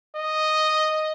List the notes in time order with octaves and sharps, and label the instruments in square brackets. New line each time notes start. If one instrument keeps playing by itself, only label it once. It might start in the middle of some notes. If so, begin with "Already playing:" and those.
[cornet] D#5